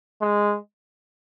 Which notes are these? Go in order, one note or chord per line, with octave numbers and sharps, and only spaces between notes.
G#3